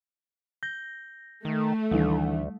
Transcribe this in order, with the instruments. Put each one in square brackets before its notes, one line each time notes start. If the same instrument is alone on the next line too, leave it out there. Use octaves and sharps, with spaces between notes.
[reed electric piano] G6 [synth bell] A#6
[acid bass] D#3 [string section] A3
[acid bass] D2 [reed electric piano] D#3 E3 D4 [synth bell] G3